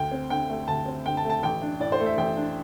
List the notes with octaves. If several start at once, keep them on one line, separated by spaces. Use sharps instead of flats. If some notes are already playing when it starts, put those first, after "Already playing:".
Already playing: D2 G5
C4
D3 G5
A3
D2 A5
C4
D3 G5
A5
A3
A5
A1 G5
D4
A2 D5
C5
A3
E5
A1 G5
D4